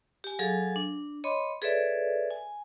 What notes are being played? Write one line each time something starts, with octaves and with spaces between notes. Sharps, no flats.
G4 G#5
F#3 G#4 A4 F5 G#5
D4
C#5 D#5 B5 C6 D6
G#4 A4 B4 C#5 D5 E5
G#5